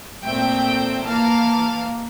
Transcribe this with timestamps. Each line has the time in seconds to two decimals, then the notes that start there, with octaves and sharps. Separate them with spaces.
0.24 A#2 A3 C4 E5 G5
1.04 E3 A#3 F5 A5